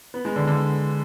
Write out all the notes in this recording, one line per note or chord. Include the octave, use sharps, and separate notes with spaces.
B3
G#3
D3
D3